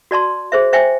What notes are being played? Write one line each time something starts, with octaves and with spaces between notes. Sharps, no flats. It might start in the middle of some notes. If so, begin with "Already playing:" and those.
F#4 D5 A5 C6
G#4 C5 E5
C5 E5 G5 G#5